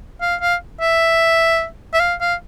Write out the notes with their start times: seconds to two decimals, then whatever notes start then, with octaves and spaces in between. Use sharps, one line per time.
0.22 F5
0.41 F5
0.81 E5
1.94 E5
2.00 F5
2.21 F5